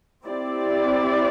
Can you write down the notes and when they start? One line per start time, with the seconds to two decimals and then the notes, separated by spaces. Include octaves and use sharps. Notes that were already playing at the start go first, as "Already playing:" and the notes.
0.25 C4 E4 G4 D5